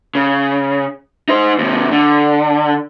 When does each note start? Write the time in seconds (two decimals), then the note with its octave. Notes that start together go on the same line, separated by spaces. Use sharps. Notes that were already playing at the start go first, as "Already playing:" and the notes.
0.15 C#3
1.29 D#4 C5
1.58 D#2 C3
1.91 D3